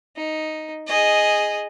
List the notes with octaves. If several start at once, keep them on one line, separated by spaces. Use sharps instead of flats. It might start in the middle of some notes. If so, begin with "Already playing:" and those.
D#4
G#4 D#5